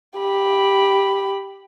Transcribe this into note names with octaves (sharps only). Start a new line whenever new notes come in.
G4 B5